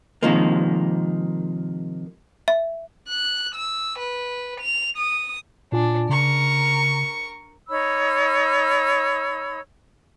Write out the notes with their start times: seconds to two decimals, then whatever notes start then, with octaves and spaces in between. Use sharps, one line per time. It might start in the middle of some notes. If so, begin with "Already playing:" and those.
0.23 C3 D#3 F3 G#3 A#3
2.48 E5
3.09 F#6
3.55 E6
3.99 B4
4.60 F7
4.97 D#6
5.72 A#2 D4 F4 G#5
6.09 C#3 A#4 C#6
7.68 D#4 C#5 B5 E6